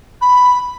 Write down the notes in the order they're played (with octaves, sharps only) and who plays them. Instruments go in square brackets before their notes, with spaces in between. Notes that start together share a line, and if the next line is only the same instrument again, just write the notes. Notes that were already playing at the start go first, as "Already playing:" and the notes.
[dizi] B5